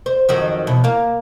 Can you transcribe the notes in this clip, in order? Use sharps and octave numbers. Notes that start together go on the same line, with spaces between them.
C5
F2 D#3 F#3
E2 B2
A#3 F5